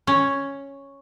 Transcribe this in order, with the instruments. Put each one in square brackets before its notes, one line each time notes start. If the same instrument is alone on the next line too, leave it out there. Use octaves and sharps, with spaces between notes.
[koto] C#4